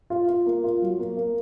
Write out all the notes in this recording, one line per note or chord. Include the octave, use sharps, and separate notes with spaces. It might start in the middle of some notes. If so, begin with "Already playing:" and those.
F4
F4
A#3
F4
F#3
A#3
A#3